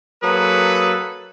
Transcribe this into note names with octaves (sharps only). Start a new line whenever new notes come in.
F#3 A#3 G#4 A4 B4